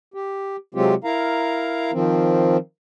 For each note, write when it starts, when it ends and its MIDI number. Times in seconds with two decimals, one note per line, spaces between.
0.14 0.56 67
0.75 0.94 48
0.75 0.94 54
0.75 0.94 56
0.75 0.94 60
0.75 0.94 65
0.75 0.94 67
1.04 1.91 64
1.04 1.91 70
1.04 1.91 77
1.04 1.91 82
1.92 2.57 51
1.92 2.57 53
1.92 2.57 60